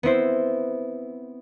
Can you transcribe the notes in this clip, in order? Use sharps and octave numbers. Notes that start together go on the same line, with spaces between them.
B3 C4 E4 C5